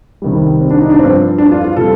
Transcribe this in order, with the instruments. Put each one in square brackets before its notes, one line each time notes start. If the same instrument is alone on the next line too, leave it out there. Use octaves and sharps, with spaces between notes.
[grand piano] C2 C3 D#3 G3
C4
D4
D#4
D4
G2 F3 C4
D4
F4
F4
C3 G3 A4